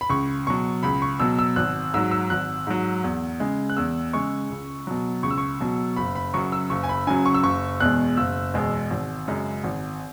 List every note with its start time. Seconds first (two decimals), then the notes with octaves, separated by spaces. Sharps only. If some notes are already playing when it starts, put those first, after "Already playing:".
0.01 B5
0.10 C#2 C#6
0.47 B2 F#3 C#6
0.83 C#2 B5
1.02 C#6
1.20 B2 F#3 E6
1.39 E6
1.56 G#1 F#6
1.94 G#2 F#3 E6
2.11 E6
2.30 G#1 F#6
2.67 G#2 F#3
3.04 E2
3.40 C#3 G#3
3.70 F#6
3.77 E2 E6
4.13 C#3 G#3 C#6
4.50 C#2
4.87 B2 F#3
5.23 C#2 C#6
5.31 E6
5.38 C#6
5.60 B2 F#3
5.96 F#1 B5
6.15 B5
6.34 F#2 C#3 F#3 C#6
6.52 E6
6.70 F#1 C#6
6.83 G#5
6.89 B5
7.07 F#2 C#3 F#3 G#5
7.26 C#6
7.34 E6
7.43 F#1 C#6
7.80 E2 B2 G#3 F#6
8.17 F#1 E6
8.54 E2 B2 G#3
8.90 G#1
9.28 F#2 C#3 G#3
9.64 G#1